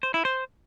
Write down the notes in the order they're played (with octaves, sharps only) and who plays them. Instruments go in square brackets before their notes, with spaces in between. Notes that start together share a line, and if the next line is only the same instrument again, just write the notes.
[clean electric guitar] C5
E4
C5